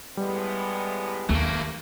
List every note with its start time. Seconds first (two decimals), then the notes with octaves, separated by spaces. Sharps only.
0.17 A2 G3 G#3 B3
1.29 D#2 A3 A#3